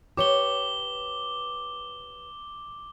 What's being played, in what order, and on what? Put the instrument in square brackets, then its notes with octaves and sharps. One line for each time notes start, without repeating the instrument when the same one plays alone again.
[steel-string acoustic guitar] G4 B4 C#5 [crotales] D6 G7